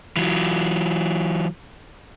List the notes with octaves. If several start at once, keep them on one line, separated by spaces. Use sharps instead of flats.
E3 F#3